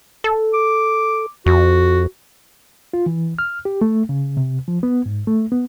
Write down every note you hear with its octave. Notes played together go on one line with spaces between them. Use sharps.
A4
D6
F2 F#4
F4
E3
F6
G4
A3
C#3
C3
F3
B3
G#2
A3
B3